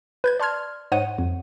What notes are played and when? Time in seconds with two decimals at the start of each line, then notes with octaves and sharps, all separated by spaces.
0.24 B4 G6 G#6
0.40 D5 A5 C6 F6 G#6
0.92 G#2 C5 C#5 D#5 F#5 D#7
1.18 F2